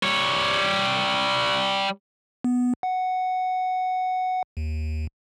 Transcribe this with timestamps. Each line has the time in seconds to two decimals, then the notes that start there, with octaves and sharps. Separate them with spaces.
0.03 G3 C#5
2.44 B3
2.83 F#5
4.57 D#2